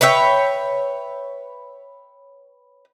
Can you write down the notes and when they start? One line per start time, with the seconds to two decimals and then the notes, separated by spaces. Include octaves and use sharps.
0.01 B4 C#5 E5 G5